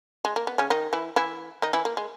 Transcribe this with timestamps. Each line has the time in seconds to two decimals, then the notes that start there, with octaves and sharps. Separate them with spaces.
0.25 G#3
0.36 A#3
0.47 B3
0.58 C#3 C#4
0.70 D#3 D#4
0.93 E3 E4
1.16 E3 E4
1.62 D#3 D#4
1.73 E3 E4
1.85 A#3
1.97 G#3